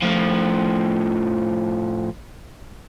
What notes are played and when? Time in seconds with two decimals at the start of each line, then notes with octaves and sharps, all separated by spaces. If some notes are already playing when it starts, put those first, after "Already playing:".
0.02 A2 F3